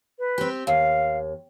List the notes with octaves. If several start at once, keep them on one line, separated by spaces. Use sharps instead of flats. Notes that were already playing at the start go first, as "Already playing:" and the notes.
B4
C4 G4
D#2 F5